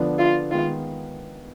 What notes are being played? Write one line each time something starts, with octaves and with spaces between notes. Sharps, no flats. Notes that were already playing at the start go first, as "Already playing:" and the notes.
Already playing: D3 F3 B3 D4
F4
D#3 G#3 B3 F4